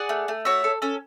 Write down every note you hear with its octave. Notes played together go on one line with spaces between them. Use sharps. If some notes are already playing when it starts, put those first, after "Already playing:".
Already playing: G#4 D5 F#5
A3
A3
F#4 C#5 E5
A4
C#4 A4